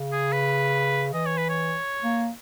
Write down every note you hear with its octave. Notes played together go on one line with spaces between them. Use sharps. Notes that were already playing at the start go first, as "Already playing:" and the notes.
Already playing: C#3
G#4
B4
E3 D#5
C#5
B4
C#5
A#3